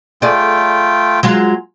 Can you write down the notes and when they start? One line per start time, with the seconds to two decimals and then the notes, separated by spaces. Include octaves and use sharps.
0.22 A3 F4 G#4 D5 G5
1.23 F#3 G#3 F4